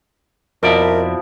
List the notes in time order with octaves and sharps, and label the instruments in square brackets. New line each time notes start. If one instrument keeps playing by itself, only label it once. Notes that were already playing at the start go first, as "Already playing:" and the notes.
[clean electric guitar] F2 D5 E5 [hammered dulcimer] B2 F3 E4 [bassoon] A#4